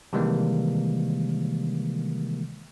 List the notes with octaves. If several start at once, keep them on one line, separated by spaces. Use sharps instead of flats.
C3 D#3 E3 G3 G#3 A#3